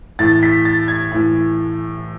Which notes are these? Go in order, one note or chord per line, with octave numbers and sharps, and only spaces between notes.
A2 E3 A6
B6
A6
G#6
A2 E3